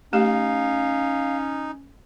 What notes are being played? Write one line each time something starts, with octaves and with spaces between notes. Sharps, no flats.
A3 C#4 D#4 G4 F5